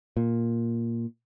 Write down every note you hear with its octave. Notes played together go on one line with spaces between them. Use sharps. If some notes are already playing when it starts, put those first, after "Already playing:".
A#2